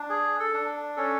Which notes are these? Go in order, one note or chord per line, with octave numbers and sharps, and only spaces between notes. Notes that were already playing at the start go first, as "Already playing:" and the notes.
Already playing: D4
G#4
A4
D4
C#4 A4